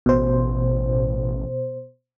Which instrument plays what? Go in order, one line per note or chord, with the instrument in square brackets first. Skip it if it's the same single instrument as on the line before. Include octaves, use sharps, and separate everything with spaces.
[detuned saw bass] A1 [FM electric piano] B2 C5